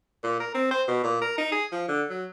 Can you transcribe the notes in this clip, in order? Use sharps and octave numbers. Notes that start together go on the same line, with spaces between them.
A#2
A#4
C4
C5
B2
A#2
A#4
D#4
G#4
F3
D3
F#3